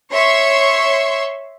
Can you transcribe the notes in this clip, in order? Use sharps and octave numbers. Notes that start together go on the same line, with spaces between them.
C#5 E5 C6 C#6